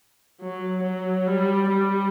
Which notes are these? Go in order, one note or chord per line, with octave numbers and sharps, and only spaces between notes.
F#3
F#3
G3
G3